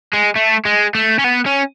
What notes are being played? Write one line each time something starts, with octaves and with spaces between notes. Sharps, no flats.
G#3
A3
G#3
A3
C#4
B3
C#4